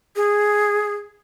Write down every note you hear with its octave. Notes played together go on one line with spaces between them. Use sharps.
G#4